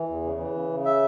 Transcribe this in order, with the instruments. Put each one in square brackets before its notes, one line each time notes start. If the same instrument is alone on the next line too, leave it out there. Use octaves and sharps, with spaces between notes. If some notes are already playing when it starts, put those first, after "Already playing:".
Already playing: [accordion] E3
E2
C#3
E3
C#3
C#3
E5